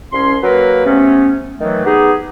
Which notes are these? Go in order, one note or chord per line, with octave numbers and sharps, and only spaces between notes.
C2 C#4 C6
F#3 A#3 A#4 B4
C3 A3 B3 C#4
D#3 E3 F#3 A3
B3 D#4 G4 G#4